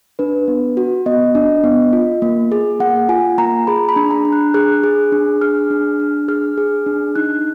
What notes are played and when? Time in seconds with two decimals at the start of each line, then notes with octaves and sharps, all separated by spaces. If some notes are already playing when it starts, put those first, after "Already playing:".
0.19 D4 B4
0.48 B3
0.77 F#4
1.06 B3 D#5
1.35 D4
1.64 B3
1.93 F4
2.22 A#3
2.52 G#4
2.80 A#3 F#5
3.09 F4 G#5
3.38 A#3 A#5
3.67 G#4 B5
3.89 B5
3.96 D4
4.11 A#5
4.25 D4
4.33 F#6
4.54 G#4 F#6
4.83 G#4
5.12 D4
5.41 G#4 F6
5.70 D4
6.00 D4
6.28 G#4 F6
6.57 G#4
6.86 D4
7.16 D#4 F#6